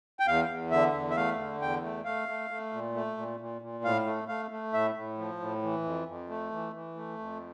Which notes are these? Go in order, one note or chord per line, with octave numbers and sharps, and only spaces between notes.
G5
E2 F5
E2
D3 E5
E2
E5
A3 F5
D3
E2 G5
A3
A3 F5
A3
A3
A#2
A3
A#2
A#2
A#2
A2 F5
A3
A3 F5
A3
A2 E5
A2
F3
A2
E3
F2
F2
A3
E3
E3
A3
F2